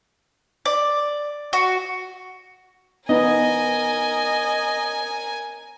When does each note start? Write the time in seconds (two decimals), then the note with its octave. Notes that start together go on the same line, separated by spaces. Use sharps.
0.66 D5
1.53 F#4
3.09 B3 D#4 A#4 D#5 G#5